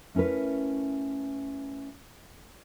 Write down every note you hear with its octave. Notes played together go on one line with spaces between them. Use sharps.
A3 C#4 E4 A#4 B4